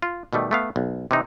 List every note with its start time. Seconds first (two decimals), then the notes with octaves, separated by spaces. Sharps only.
0.02 F4
0.33 B2 D#3 G3 A3
0.51 A3 B3 F5
0.76 B1
1.11 C3 E3 D#4